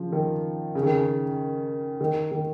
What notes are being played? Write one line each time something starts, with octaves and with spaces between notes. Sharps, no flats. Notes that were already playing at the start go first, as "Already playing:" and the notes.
Already playing: C#3 F3
D#3
C#3
D#3
C#3
D#3
D#3